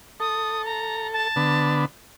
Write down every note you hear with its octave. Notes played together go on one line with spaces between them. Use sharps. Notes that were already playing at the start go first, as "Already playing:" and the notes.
A4 D#6
A#5
A5
D3 B3